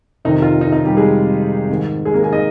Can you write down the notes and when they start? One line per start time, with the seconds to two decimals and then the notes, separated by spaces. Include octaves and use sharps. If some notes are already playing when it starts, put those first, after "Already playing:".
0.25 F2 C3 D#3 D#4
0.42 F4
0.61 D#4
0.72 D#4
0.85 G3 G4
0.97 G#3 G#4
1.69 G#2 D#3
2.05 G#3 G#4
2.14 A#3 A#4
2.23 G#4 G#5
2.32 D#4 D#5